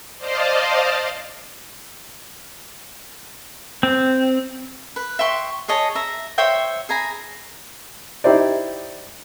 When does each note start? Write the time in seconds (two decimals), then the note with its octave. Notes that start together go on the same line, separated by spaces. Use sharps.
0.18 C5 D5 D#5 F5 A5
3.83 C4
4.96 B4
5.19 E5 G5 C6 C#6
5.68 G#4 C#5 D#5 A5
5.95 E5 A#5
6.38 C5 C#5 E5 G5
6.89 G#4 G#5 A#5 B5
8.24 D#4 E4 G4 C5 D5